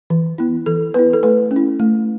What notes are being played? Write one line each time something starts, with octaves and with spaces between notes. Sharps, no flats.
E3
B3 E4
E3 A4
B3 E4 B4
A4
A3 B4
C#4
E4
A3